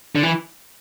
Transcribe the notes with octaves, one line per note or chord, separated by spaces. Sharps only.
D3
E3